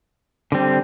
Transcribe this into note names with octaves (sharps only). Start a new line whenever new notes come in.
D3 G3 C4